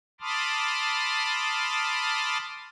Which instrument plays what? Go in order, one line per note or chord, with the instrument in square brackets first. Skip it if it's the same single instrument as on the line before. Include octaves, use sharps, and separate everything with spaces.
[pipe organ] A5 B5 C6 D6 D#6 F6